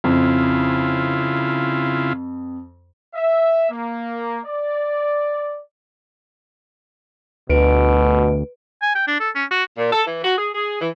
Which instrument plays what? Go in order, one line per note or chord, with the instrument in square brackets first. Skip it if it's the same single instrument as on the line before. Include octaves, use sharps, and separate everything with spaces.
[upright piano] F2 [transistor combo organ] C#3 E4 F4
[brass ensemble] E5
A#3
D5
[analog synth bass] D2 [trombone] B2 [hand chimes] B4 D7
[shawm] G#5
G5
D4
A4
C#4
F#4
[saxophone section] A#2
A4
E3
F#4
G#4
G#4
E3